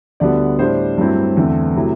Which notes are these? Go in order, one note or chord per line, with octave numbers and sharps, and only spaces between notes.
D2 D3 G3 B3 D5
A2 G3 D4 C5
G2 F#3 A3 C4 E4
E2 D3 A3 C4
C3 F#3 A3 E4